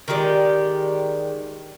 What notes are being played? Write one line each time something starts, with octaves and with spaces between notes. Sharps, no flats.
D#3 G#3 G4 D5